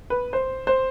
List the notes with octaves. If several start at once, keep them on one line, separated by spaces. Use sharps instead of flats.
B4
C5
C5